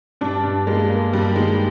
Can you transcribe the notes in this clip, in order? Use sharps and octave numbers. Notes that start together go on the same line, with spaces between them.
G2 D4
G2
G#3 A#3
A#3
G2 G3
D#3 G#3